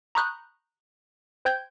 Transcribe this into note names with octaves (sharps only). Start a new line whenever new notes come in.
A#5 B5 C#6 D#6 F#6 G6
C5 G5 G6 G#6